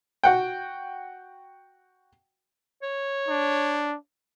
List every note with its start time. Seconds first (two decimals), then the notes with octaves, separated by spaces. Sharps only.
0.24 F#4 F#5 G5
2.82 C#5
3.28 D4